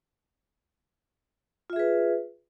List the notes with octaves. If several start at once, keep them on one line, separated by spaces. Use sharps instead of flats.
F4 G#4 B4 E5